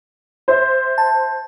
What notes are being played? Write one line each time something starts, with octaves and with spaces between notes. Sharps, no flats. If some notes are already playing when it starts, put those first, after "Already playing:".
C5 E5
A5